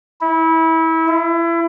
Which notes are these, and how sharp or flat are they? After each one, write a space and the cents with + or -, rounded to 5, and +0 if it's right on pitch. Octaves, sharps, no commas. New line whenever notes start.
E4 -25
E4 +30